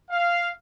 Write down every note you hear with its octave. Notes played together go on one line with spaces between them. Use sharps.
F5